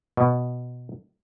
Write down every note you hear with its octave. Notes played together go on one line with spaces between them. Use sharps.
B2